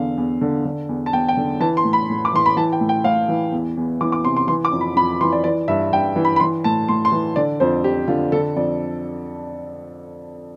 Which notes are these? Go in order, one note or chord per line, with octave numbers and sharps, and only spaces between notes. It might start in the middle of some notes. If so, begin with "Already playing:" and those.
Already playing: E2 D3 F5
E2
D3
D3
E2
A5
E2 G5
G5
D3
E3 A5
C6
A2
B5
A2
D6
E3 C6
B5
E3 A5
G5
A2
G5
A2 F5
E3
E2
E2
E3 D6
D6
C3 C6
C6
E3 C6
D6
F2
B5
F2 B5
E3 C6
D5
E3 D5
G2 E5
G2 G5
E3
B5
B5
E3 C6
A2 A5
A2 C6
C6
E3
D3 D5
F2 C5
F2 G4
D3 F4
D3 A4
F2 D5